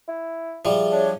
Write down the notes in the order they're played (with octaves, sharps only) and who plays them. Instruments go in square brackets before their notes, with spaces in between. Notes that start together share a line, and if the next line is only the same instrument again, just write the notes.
[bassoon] E4
[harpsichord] F3 G3 [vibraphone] G#4 E5
[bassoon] D4 [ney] C#5